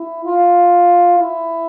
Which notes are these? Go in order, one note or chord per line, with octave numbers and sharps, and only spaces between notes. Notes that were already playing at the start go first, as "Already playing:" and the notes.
Already playing: E4
F4
E4